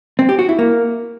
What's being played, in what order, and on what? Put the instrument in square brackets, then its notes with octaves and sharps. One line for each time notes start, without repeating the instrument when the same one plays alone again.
[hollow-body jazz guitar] C4
G4
F#4
E4
A#3